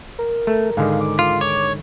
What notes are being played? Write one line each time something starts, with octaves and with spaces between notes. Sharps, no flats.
A#4
A3
G#2 D3 D#3 F5
D6
F4
C#5 D6